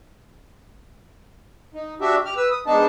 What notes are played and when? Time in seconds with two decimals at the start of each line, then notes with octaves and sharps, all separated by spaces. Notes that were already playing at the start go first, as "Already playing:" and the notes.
1.74 D#4
2.01 D4 F#4 G4 E5
2.25 G4 F6
2.37 B4 E6
2.50 D#6
2.66 G#2 B3 D4 D#4 A5